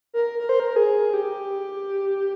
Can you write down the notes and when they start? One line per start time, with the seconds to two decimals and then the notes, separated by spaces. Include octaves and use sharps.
0.14 A#4
0.39 A#4
0.49 C5
0.60 A#4
0.76 G#4
1.14 G4